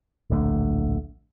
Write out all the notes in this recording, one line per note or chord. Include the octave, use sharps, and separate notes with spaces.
D1 A#1 D3 A3